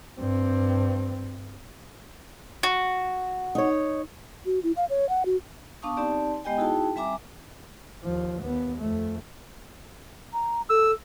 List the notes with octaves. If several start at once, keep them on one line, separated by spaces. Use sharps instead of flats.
G2 C4
F#4
D#4 C#5
F#4
E4
F5
C#5
F#5
F#4
B3 D4 F5 A5 C#6 D#6
C4 D#4 G4 D5 A5
G#3 B3 G4 D#5 G5 G#5
D#4 E4 F#4 G#4 G5 A5
G3 C4 E5 G#5 A#5 D6
D#2 F3
D#2 B3
F2 A3
A#5
A4 E6